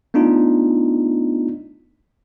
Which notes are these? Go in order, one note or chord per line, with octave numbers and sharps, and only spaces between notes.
A3 B3 D4 D#4 F4